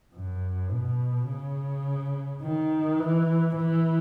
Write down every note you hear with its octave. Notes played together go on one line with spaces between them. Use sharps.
F#2
B2
C#3
D#3
E3
E3